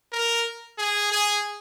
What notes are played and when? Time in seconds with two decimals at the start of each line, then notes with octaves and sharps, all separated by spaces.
0.12 A#4
0.78 G#4
1.12 G#4